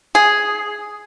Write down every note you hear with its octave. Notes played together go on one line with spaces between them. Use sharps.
G#4